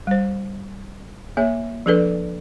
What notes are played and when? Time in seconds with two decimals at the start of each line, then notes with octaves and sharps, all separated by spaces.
0.07 G3 C5
1.37 A#3 G#4 C#5 E5
1.86 F3 D4 G#4 A4 B4 D5